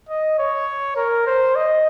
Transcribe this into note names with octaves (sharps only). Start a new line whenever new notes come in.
D#5
C#5
A#4
C5
D#5